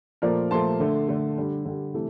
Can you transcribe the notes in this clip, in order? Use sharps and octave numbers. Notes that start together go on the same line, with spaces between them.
A#2 F3 A3 A#4 D5
A#2 F3 A3 A5 C6
D3 A3
D3 A3
D3 G3
D3 G3
C3 E3 A3